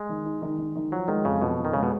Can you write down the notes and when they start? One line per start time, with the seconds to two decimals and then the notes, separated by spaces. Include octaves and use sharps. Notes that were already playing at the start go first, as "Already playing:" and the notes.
Already playing: G#3
0.09 D#3
0.26 D#4
0.42 D#3
0.58 D#3
0.75 D#3
0.92 F3 F#3
1.08 D#3 G#3
1.25 F2 C#3
1.42 F2 B2
1.59 F2
1.65 D#3
1.73 C#3 G#3
1.83 B2